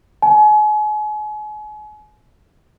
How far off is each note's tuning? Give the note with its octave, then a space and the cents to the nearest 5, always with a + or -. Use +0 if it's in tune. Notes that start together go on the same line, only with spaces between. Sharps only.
G#5 +35